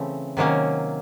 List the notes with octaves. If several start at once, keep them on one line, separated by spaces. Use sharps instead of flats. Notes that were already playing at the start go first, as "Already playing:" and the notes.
Already playing: C#3 E3 A3 C4
C3 D#3 F#3 A#3 C#4